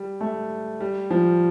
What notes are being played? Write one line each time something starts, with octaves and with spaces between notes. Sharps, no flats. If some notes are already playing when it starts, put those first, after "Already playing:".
Already playing: G3
A3
G3
F3